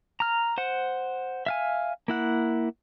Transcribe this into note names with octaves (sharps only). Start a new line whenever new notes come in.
A#5 F6
C5 F#5
E5 F5 G#5
A#3 E4 F#5